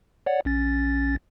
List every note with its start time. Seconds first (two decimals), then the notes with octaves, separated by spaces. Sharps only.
0.26 C#5 D5 F#5
0.45 A#1 C#4 A6